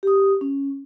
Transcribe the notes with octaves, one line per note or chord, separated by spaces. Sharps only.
G4 D#6
C#4